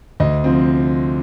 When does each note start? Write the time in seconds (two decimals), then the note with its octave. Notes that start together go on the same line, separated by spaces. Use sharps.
0.20 D2 D#5
0.44 C3 F3 C4